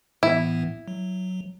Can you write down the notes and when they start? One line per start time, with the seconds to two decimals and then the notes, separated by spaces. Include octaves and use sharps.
0.23 A2 E3 B3 E4
0.88 F#3